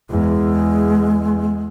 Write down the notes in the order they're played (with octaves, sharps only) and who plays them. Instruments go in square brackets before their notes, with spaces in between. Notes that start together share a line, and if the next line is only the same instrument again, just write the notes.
[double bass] E2 [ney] G#3